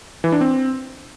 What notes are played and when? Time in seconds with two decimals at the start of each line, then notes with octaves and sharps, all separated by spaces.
0.24 E3
0.32 D4
0.41 C4